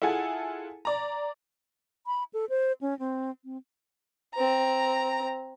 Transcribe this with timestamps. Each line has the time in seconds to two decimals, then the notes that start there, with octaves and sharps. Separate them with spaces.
0.02 E4 F4 G#4 A4 F#5 G#5
0.85 D5 A#5
2.06 B5
2.34 A4
2.49 C5
2.81 C#4
2.99 C4
3.44 C4
4.34 C4 A#5